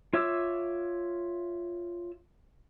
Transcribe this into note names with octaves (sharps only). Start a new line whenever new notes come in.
F4 C#5 E5 D6 E6